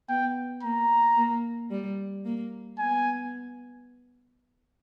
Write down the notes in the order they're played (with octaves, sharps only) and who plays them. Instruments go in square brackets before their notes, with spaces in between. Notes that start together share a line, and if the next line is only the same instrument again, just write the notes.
[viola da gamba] B3 [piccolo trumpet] G5
[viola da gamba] A#3 [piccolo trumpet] A#5
[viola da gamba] A#3
G3
A#3
[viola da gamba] B3 [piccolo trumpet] G#5